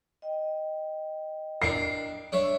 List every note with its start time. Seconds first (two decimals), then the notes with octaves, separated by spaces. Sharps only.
0.22 D#5 G5
1.62 D4 A#4 C7
2.32 D4 C#5 E5